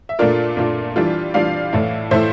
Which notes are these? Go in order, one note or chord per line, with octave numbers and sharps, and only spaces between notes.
E5
A#2 A3 D4 F4 A#4 D5
A#2 A3 D4 F4
E3 G3 D4 F4
E3 G3 D4 F4 D5 F5
A2 E3 A3 E4
A2 E3 A3 E4 C5 E5